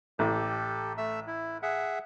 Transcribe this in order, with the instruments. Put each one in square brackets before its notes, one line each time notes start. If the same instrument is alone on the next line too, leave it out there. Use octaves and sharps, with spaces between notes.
[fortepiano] A1 [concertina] G4 A4
[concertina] A3 E5 E6
E4
G#4 E5 F#5